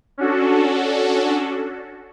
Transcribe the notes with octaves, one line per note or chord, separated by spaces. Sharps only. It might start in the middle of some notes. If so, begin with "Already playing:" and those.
C#4 D4 F#4 A4